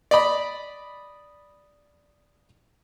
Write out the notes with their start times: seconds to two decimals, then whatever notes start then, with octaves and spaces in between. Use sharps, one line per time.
0.11 D5 D#5 B5